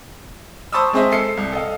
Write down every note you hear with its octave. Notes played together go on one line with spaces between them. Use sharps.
C5 A5 B5 C#6 D#6 E6
G#3 C4 G#4 C5 D#5 E5
A4 C7 C#7
C2
A4 D#5 F5